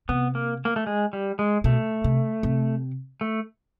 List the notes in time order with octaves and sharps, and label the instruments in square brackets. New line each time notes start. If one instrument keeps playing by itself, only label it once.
[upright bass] C3 [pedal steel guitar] B3
[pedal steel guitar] A#3
A#3
A3
G#3
G3
G#3
[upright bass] B2 [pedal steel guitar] A3
[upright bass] C3
C3
[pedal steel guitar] A3